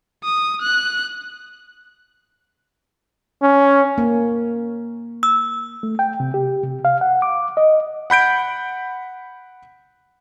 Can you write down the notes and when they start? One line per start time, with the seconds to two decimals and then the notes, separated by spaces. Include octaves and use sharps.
0.24 D#6
0.62 F#6
3.42 C#4
3.98 A#3
5.23 E6
5.83 A3
5.99 G5
6.20 C3
6.34 G4
6.63 C3
6.85 F5
7.01 F#5
7.22 D6
7.57 D#5
8.10 F#5 B5 G6 D7